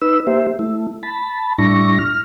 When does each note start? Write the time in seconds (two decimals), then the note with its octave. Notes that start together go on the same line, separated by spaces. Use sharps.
0.02 D#4 B4 E6
0.27 A#3 G4 C5 E5
0.59 A3 E4
1.03 A5 B5
1.58 A2 G3 D4 E4 C#6 A#6
1.99 F6